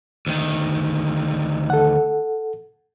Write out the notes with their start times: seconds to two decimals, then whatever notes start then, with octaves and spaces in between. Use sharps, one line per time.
0.27 D2 D#3
1.70 A4 F#5